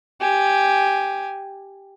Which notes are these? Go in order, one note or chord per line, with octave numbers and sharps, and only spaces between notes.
G4 G#5